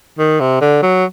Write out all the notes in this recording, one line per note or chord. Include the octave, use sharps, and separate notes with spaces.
D#3
C3
D3
F#3